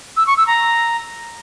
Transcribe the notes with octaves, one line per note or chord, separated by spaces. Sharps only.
E6
C#6
E6
A#5